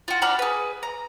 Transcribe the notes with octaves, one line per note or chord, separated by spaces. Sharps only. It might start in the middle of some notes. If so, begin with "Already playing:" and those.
F4 F#4
D4 F#4 B5 F6
G#4 B4
A#5